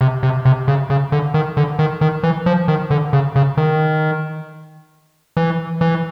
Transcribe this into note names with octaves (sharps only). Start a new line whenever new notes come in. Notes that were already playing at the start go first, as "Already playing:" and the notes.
C3
C3
C3
C#3
C#3
D3
D#3
D3
D#3
D#3
E3
F3
D#3
D3
C#3
C#3
D#3
E3
E3